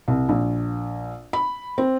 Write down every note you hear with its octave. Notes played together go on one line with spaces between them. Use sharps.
C2
A#1
B5
C4